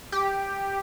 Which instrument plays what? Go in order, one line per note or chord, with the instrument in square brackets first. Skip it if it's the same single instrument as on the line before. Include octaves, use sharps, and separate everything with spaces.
[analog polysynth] G4